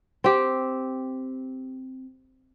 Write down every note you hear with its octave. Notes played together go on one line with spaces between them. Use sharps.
C4 G4